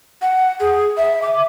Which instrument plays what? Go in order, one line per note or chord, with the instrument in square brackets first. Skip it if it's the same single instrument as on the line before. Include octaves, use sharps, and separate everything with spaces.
[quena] F#5
G#4
E5
D6